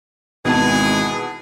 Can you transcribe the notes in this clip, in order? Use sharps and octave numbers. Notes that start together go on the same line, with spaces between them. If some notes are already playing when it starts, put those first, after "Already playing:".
G#1 B2 E3 G#3 B3 G#4 A5